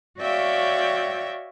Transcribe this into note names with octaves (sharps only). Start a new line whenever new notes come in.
F#4 C#5 D5 E5 F5 G5